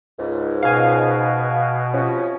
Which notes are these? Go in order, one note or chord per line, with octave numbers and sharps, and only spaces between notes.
C#2 G#2
B2 F5 G#5
C3 F3 C#4